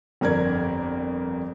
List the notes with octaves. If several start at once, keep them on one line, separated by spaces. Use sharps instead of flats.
G1 F2 A#4 D5 G#6